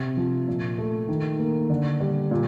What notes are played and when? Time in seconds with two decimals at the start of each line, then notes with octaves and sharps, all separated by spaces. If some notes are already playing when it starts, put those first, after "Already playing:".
Already playing: C3
0.17 F3
0.48 A#2
0.78 A3
1.09 D#3
1.39 A#3
1.70 D3
2.00 G3
2.31 A#2